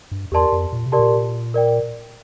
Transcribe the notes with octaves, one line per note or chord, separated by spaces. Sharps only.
G2
E2 G4 A#4 D5 A5 C6
F2
A#2
C3
G4 A#4 D5 A5 C6
A#2
A#4 D5 G5